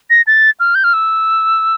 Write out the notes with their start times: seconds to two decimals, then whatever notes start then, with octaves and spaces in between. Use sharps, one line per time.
0.10 A#6
0.27 A6
0.60 F6
0.75 G6
0.84 F6
0.93 E6